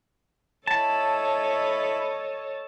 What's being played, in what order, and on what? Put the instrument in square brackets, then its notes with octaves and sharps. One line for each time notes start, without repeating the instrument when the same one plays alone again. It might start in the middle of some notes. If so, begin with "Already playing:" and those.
[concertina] E4 B5 [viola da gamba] A4 C#5 D#5 [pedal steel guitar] A5